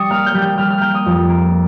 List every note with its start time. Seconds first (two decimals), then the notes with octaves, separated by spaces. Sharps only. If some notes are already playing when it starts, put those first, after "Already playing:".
Already playing: G3 C#6 D#6
0.10 A#3 F6
0.26 G6
0.34 G3
0.41 G6
0.58 G3 F6
0.70 F6
0.81 A#3 G6
0.94 D#6
1.06 F2
1.29 A#3